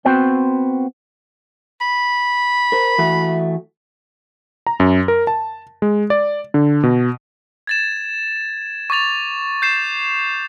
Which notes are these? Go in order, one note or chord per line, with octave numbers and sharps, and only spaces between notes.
B3 C4 F#4 C5 G5
B5
A#4 C5
E3 A3 F#4
A#5
F#2
A#4
A5
G#3
D5
D3
B2
G#6 A6 E7
C#6 D6 A6 F7
G6 C7 E7